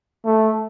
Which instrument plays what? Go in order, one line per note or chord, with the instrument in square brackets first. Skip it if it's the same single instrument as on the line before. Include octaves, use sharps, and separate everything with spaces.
[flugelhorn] A3